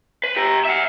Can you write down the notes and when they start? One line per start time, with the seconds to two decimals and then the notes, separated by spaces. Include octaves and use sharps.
0.24 B4
0.36 G4 A#5
0.65 E5 F#5